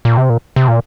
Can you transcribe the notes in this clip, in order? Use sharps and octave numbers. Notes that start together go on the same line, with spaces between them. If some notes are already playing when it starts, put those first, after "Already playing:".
A#2
C3
A#2
C3
A#2